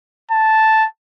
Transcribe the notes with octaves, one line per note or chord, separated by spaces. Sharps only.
A5